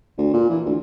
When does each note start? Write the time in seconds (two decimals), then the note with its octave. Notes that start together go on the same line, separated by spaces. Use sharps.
0.18 D2
0.34 A#2
0.50 E3
0.66 D2